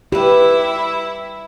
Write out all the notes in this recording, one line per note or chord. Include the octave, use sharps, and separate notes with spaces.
G3 E4 G4 B4 E5